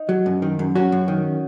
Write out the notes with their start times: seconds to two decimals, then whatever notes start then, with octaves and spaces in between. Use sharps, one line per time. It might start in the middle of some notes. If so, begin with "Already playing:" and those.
Already playing: D#4
0.09 F#3
0.26 F#2
0.42 D#3
0.59 F#2
0.75 F#3 C#4 F#4
0.92 F#2
1.08 D#3